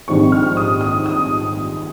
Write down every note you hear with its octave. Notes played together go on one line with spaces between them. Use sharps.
A#1 G#2 D#3 G3 C4 C#6
F6
D#6
D#6
D#6